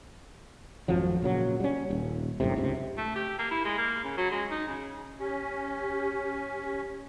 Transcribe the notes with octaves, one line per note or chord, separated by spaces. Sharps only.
G#1 F2 F3 F#3
A#2 C#3 F#3
G3 C#4
D#1
G1 F#2 A2 C3
C#2 G#2 C3
A3
G4
A#3
E4
G#3
A#3
C#3
F#3
G#3
D#4
C#3
C#4 G4